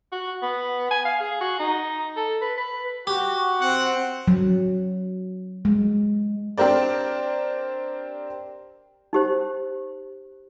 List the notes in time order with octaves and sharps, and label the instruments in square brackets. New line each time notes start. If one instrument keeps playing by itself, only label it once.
[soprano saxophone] F#4
B3
G#5
F5
G#4
F#4
D#4
A4
B4
B4
[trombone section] F#4 [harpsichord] G4
[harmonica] C4 [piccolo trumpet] F#5
[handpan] F#3
G#3
[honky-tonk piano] C4 D4 G4 A#4 C5 D5
[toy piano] D#4 G4 C5